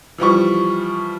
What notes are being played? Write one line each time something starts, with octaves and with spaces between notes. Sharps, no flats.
E3 F3 G3 C#6